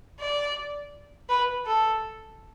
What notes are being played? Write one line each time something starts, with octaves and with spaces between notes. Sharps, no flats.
D5
B4
A4